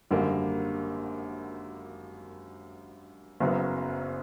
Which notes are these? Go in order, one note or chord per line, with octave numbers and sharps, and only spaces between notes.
G#1 F#2 D3 G3 A#3
F#1 F#2 C#3 F#3 B3